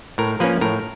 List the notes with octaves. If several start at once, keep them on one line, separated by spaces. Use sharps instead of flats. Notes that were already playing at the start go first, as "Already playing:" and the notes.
A2 A#4
F3 A#3 C#4 B4
A2 A#4